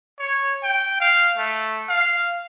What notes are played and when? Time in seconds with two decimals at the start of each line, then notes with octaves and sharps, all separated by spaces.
0.19 C#5
0.63 G5
1.01 F5
1.38 A3
1.89 F5